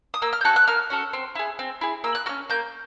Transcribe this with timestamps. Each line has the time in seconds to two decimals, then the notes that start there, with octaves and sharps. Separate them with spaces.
0.14 D#6
0.22 A#3 E6
0.33 F6
0.41 G6
0.44 C#4 F#4 A4 F#6
0.56 F#6
0.68 A#3 F6
0.90 C#4 F#4 A4
1.13 C4
1.35 E4 G#4
1.59 C4
1.81 E4 G#4
2.04 A#3 E6
2.15 F#6
2.26 C#4 F#4 F6
2.50 A#3 G6